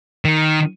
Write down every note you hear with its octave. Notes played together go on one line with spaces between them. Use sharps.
D#3